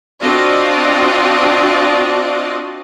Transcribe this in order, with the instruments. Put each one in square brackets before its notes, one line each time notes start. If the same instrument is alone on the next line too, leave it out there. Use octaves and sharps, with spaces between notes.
[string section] C4 D4 F4 F#4 D5 D#5